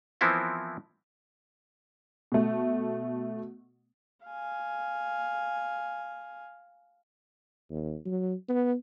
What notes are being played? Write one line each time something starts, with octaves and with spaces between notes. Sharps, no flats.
E3 F3 B3 C4 E4 A#4
B2 A3
F5 G#5
D#2
F#3
B3